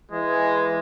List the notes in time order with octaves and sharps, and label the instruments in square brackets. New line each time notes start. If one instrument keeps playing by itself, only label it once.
[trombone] E3 [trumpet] G#3